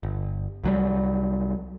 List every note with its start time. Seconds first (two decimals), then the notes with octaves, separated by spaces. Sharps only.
0.03 G1
0.64 C2 F#3 G3